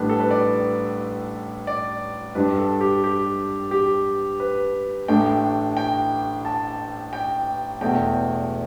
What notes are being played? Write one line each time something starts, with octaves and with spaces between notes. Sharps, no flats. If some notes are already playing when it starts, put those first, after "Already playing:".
Already playing: A1 A2 G3 D4 B4
A4
B4
D5
D5
G2 G3 D4 B4
A4
G4
G4
G4
B4
A1 A2 A3 D4 G5
G5
A5
G5
E1 E2 B2 A3 G5